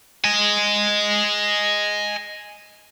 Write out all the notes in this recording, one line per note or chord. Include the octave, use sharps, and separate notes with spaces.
D#5 G#5